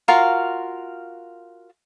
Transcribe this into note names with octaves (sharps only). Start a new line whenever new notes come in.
F4 F#4 A#4 F5